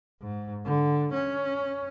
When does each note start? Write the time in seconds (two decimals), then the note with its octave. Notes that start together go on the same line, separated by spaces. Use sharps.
0.21 G#2
0.65 D3
1.13 C#4